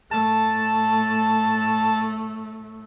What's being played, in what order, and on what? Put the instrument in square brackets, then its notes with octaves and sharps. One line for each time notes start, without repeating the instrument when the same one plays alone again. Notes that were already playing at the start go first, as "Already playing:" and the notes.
[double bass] A2 A3 [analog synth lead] A5